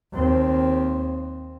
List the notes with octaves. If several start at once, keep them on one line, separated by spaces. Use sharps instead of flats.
D#2 C4